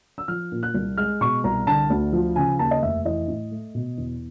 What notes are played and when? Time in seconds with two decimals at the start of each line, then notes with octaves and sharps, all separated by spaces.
0.18 E6
0.28 F3 F6
0.52 A#2
0.63 F#6
0.74 C2
0.97 G#3 F6
1.21 B2 C#6
1.44 C2 A#5
1.67 D3 A5
1.90 D2
2.13 F3
2.36 C#3 G#5
2.59 D#2 A5
2.71 D#5
2.82 F1 E5
3.05 E3 D#5
3.28 A2
3.51 A3
3.75 B2
3.98 E2